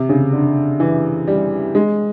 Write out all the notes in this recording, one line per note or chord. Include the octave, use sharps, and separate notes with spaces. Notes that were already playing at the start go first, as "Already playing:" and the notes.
Already playing: C3
C#3
D3
E3
G3
G#3